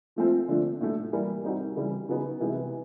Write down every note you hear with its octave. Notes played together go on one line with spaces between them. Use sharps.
F3 A3 C4 F4
D3 F3 A3 D4
A2 F#3 A3
E3 G3 A#3
G3 C4 D#4 F#4
C#3 E3 G3
C#3 F#3 B3 D#4
C3 E3 G#3 B3 E4